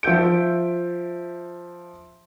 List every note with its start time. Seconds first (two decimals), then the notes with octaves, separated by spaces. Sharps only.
0.03 F3 E5 G6 D7